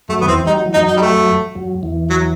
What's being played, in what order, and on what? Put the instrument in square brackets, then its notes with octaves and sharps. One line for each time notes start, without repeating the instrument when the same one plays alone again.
[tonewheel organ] F#2 F#3 [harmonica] A3
[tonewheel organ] D#3 [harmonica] B3
[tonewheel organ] E2 E3 [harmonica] C4
[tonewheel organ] G3 [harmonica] D#4
[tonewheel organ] F#3
E3
[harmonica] D#4
[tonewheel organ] F#2 F#3
[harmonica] D#4
G3
A3
[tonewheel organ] F#2 F#3
E2 E3
[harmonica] F#3